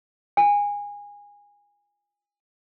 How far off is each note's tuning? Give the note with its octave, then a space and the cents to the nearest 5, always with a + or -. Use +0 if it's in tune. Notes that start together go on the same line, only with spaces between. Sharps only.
G#5 -20